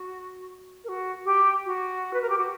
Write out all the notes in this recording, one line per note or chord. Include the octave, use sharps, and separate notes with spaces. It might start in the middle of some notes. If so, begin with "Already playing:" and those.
Already playing: F#4
A#4
F#4
G4
F#4
B4
A#4
G4
F#4